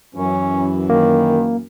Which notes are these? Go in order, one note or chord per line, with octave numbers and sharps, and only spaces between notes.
F#2 E3 C#4
D#3 A#3